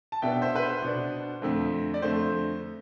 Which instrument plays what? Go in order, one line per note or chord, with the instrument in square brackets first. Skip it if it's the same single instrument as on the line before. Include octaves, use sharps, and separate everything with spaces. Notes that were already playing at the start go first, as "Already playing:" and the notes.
[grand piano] A5
B2 B3 D4 E5 G5
C5 E5
B4
C5
B2 B3 D4
F2 D3 A3 C4
D5
F2 D3 A3 C4 C5